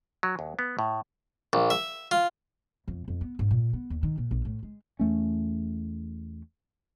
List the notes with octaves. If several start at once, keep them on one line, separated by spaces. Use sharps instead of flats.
F#3
D#2
B3
A2
A#1
E5
F4
F2
F2
B3
G#2
A#2
B3
D#2
D#3
A#2
A#1
A2
G#3
E2 A3 C#4